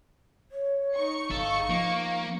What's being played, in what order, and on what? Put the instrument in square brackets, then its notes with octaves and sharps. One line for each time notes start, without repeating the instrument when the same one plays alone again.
[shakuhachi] C#5
[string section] D#4 C#6 C#7
[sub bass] G1 [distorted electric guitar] A4 [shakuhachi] F5
[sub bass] F3 [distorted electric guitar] A#3